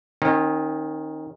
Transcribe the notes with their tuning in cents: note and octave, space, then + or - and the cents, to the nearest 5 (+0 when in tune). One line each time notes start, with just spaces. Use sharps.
D#3 +0 C#4 -45